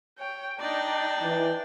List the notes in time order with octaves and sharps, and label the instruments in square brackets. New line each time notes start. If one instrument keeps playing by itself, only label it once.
[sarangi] C#5 [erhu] G5
[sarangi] D4 [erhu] D#4 [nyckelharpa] D5 G5
[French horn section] E3